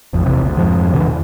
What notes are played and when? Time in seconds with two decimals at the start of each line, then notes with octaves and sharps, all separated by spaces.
0.13 D#1 A1 F2
0.26 D1 B1 E2 C3
0.46 D2
0.58 F2 G#2 F3
0.93 C#2 B2 D3 E3
1.09 E2